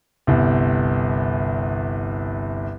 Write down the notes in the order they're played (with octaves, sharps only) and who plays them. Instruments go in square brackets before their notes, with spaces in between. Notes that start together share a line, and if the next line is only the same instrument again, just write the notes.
[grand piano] G1 C2